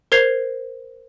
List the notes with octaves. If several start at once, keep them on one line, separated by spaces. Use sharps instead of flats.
A#4 C5 G#6 C7 F7